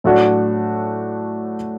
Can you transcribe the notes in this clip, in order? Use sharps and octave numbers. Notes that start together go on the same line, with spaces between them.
A2 F#3 A3 D4 F#4